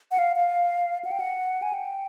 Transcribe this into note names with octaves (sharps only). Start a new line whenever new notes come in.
F#5
F5
F5
F#5
G5
F#5
G#5
G5